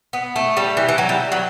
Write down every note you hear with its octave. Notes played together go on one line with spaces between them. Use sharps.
B3
A3
G3
E3
E3
F#3
G3
F#3